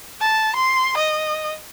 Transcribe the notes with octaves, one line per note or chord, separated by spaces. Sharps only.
A5
C6
D#5